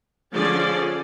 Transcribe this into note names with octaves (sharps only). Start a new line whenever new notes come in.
D3 F3 C#4 G#4 D5